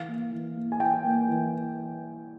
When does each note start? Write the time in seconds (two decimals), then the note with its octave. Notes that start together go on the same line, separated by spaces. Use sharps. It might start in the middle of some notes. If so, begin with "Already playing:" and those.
Already playing: E3 F5
0.08 A#3
0.32 E3
0.57 A#3
0.72 G#5
0.80 E3 G5
1.04 A#3
1.29 E3